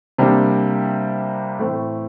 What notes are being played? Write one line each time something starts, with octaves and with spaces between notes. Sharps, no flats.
C3 G3 A#3 D4
A2 E3 A3 C4